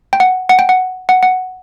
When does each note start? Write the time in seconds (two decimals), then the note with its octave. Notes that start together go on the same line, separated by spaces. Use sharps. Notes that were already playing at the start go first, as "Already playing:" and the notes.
0.13 G5
0.20 F#5
0.49 F#5
0.59 G5
0.69 F#5
1.09 F#5
1.23 F#5